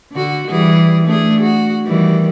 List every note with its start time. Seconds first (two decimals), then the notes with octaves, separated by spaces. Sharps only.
0.12 D3 F#4
0.50 E3 G3 G#4
1.05 A3 D4 G#4
1.41 F#4
1.86 D#3 E3 G3